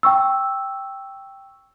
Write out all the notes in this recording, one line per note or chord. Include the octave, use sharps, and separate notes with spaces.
G5 C#6 E6